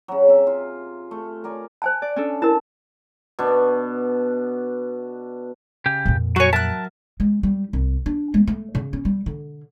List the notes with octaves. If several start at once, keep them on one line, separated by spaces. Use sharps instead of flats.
C#3 F#3
C3 E5
F4
A3
A#4 D5 G#5
C5 G#5 A5
D5
C#4 D4 A4
E4 A#4 A5
B2 B3 D4
C#3 G4
F2 A#2
F#3 F#4 C#5 G#5
F#3 A#4 E5 A5 F#6
G#3
G3
C2
D4
G#3
A3
C#3
C#4
G3
D3